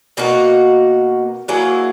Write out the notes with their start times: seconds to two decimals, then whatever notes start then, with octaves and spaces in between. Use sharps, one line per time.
0.17 B2 A#3 D#4 F#4
1.48 F#3 A#3 E4 G#4